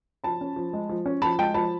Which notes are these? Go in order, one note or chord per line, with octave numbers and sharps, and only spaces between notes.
F3 A5 B5
C#4
F3
G#3
F3
C#4
F3 A5 B5
G#3 G5 A5
F3 A5 B5